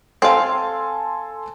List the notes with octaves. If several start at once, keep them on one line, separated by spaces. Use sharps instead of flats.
C4 A4 F5 G#5 C6